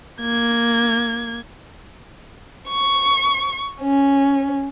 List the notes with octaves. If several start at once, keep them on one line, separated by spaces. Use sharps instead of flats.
A#3 G#6
C#6
C#4